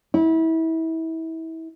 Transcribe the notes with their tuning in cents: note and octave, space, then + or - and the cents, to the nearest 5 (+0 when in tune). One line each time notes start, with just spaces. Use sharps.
E4 -30